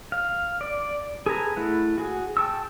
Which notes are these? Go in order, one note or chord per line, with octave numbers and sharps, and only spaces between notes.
F5
D5
G#4 A4 B4 G#5 A#5
A3 E4 F#5
F#4 G#4
G5 A5 C#6 E6